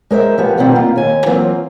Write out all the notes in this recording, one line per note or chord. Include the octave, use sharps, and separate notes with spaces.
G#3 A#4 C5 E5
F3 B3 F#4 G4
B2 D#3 F3 G3 B3 C4
A#3 F4
D#2 G#5
E3 F#3 A#3 C4 F4